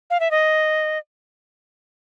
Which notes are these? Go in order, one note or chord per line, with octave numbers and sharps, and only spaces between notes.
F5
E5
D#5